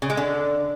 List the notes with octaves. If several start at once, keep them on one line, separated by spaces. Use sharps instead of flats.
C#3
G#3
D3